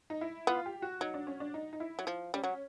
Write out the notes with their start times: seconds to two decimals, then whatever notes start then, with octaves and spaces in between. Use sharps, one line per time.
0.10 D#4
0.21 E4
0.47 B3 F4
0.66 G4
0.82 F#4
1.01 F#3 D#4
1.14 D4
1.27 C#4
1.40 D4
1.54 D#4
1.73 D#4
1.80 E4
1.99 F#3
2.07 F3
2.34 G3 C#4
2.44 F#3